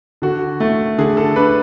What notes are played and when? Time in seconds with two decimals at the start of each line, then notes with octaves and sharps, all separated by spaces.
0.22 D3 F#4
0.60 A3
0.98 D3 G#4
1.17 A4
1.36 D4 B4